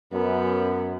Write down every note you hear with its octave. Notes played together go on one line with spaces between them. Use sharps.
F#2 B3